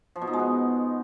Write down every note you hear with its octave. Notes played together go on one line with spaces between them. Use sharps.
F3
B2
D#4
G#3
B3